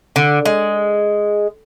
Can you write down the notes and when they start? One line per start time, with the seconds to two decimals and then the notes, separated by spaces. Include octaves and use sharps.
0.16 D3
0.46 G#3